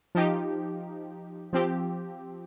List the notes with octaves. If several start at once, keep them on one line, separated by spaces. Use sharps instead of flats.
F3 D#4 G4
F3 C4 G4